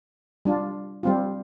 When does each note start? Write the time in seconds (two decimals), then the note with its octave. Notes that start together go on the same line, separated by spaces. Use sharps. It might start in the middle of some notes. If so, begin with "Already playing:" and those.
0.45 G3 D4 F4
1.03 G3 C4 F4